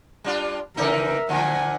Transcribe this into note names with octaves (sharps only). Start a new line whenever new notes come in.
G3 D4 F4
C#3 E3 D#4 A#4 E5
A#2 D3 F3 F#5 G#5